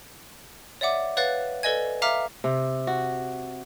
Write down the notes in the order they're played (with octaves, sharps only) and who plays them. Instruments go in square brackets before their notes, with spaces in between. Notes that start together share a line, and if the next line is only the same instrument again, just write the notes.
[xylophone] C#5 D5 E5 F#5 D6
B4 C#5 F5 F#5 F#6 A6
A4 B4 D5 D#5 G#5 G#6
E5 F5 A#5 D6 F6 B6
[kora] C3
F#4